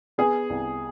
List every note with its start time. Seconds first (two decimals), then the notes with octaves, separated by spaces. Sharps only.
0.18 B3 G#4
0.50 C2